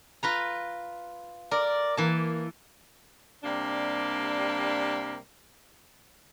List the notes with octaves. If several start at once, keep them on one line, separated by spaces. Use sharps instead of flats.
F4 B4 A#5
A#4 D5
E3 A#3 A5
C3 G3 A#3 D4